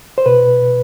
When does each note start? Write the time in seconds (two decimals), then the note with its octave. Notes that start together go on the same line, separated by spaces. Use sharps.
0.18 C5
0.26 B2 B4